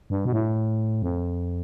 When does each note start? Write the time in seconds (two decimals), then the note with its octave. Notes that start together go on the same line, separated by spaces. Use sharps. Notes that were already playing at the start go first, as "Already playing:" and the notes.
0.10 G2
0.25 B2
0.32 A2
1.02 F2